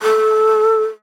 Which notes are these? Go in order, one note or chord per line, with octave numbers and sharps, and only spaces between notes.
A4